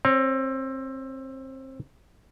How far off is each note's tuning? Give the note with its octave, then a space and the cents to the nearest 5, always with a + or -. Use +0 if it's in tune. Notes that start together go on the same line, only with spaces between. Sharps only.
C4 +25 C#5 +5